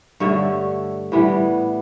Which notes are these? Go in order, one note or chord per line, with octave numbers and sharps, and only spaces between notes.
G2 D3 A3 C#5 E5
A2 E3 G3 B3